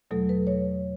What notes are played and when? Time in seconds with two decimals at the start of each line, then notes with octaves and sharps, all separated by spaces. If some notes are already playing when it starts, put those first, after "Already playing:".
0.11 E2 B2 F#3 A3 A4
0.29 B4
0.47 C#5